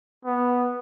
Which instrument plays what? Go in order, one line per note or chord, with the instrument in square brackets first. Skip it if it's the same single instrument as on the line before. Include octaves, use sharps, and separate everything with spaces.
[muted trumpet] B3